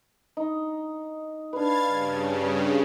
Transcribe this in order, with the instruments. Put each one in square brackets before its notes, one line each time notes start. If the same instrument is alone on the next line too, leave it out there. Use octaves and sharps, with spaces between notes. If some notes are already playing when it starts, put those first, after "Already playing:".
[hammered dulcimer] D#4
[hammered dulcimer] D4 B4 [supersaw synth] F5 G#6 A6
[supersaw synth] G2 C#3
[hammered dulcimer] C#5